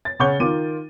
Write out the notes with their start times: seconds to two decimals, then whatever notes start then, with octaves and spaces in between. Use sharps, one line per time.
0.05 A6
0.19 C#3 C#4 F#5 C#6 G6 G7
0.40 D#3 F4 D6 D#7